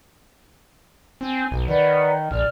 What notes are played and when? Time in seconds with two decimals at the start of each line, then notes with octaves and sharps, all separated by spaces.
1.21 C4 G#5
1.51 B1
1.68 D#3 B4 D5 F#5
2.31 A#1 D5 F6